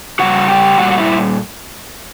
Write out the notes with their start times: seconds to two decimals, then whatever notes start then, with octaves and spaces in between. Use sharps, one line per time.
0.19 C#3 G3 F#4 F#5
0.48 G4 G5
0.78 A#2 G3 F#4 F#5
0.91 F#5
0.98 E4 E5